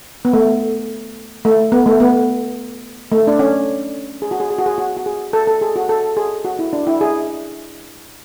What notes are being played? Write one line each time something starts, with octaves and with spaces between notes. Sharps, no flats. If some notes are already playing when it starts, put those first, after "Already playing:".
B3
A3
A3
B3
A3
B3
A3
D4
C#4
G#4
F#4
G#4
G#4
F#4
G#4
F#4
F#4
G#4
A4
A4
G#4
F#4
A4
G#4
F#4
E4
D4
E4
G#4